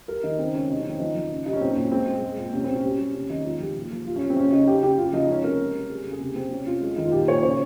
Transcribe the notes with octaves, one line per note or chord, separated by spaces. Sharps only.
G3 A#4
D#3 D#4
C#3 C4
G#3 C#4
C3 D#4
C#4
D#3 C4
F3 D#4
F3
C#3
G3 D#4
C#4
A#2 C4
C#4
A#2
G#3 C4
G#3
G#3
A#2
C3 C#4
C3 C4
C#4
G3
G3
C3 C#4
D#3 D#4
G#3 F4
F3 G4
A#2
F3
G3 F4
C#4
G3
C4
C#3 C#4
C#3 D#4
C#3 G4
C#3 G4
C#3 F4
F3 D#4
G#3 C#4
C3 A#4
G3
C3
G3 G#4
C#3
G#4
C3 G4
C3 C4
C3 C#4
C3 F4
G#3
D#3 D#4
F4
A#2 G4
A#2 C#5
C#3 C#5